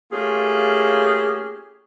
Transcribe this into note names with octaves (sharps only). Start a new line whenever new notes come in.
A3 A#3 C#4 F4 G4 G#4